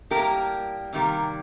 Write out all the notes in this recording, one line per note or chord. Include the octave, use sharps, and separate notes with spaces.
A2 G3 A#3 G4 A#4
C3 D#3 G3 A#3